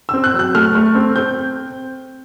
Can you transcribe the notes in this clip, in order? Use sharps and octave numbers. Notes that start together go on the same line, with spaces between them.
C4 E6
F#6
F#3
F#6
A3 F6
A3
C4
C4 G6